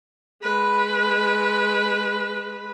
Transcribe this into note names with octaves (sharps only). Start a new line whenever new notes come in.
G#3 B4